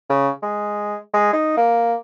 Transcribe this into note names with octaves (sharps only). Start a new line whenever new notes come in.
C#3
G#3
G#3
D#4
A#3